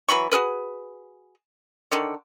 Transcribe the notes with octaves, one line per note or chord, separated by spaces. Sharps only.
E3 F#3 B5 C#6
F#4 G#4 A#4 B4
D3 D#3 C#5